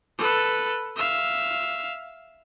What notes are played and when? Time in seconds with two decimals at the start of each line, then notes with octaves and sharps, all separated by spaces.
0.19 A4 B4
0.97 E5 F5